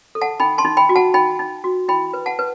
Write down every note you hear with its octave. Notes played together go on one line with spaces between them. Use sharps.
A4
F#5 A5
D#4 G5 B5
A5 C6
D#4
G5 B5
F#4
F#5 A5
D#4 G5 B5
D#4
F#4
E4 G5 B5
B4
F#5 A5
B4